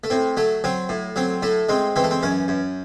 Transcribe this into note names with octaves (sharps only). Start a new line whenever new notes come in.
A3
A2 C4
F#3 A3
F#3 C4
A2
F#3 C4
A2 A3
G#3 C4
E3 C4
A3
C4
F#2 C#4
F#2